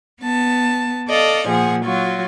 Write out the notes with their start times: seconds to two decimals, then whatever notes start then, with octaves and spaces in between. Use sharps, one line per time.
0.22 B3 A5
1.08 A4 D5 D#5 F5
1.48 A#2 F3 G#4 F#5
1.84 F#3 F4 F#4